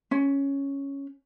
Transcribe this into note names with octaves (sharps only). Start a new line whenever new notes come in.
C#4